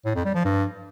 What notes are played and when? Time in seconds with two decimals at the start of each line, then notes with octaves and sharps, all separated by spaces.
0.05 A2
0.15 F2
0.25 G3
0.35 F3
0.45 G2